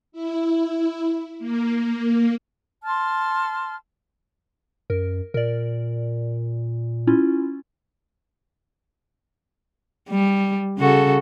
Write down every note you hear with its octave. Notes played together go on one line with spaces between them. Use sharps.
E4
A#3
A5 C6 F6
F#2 A#4
A#2 A#4 D5
C#4 E4 F4
G3
C#3 F#4 A4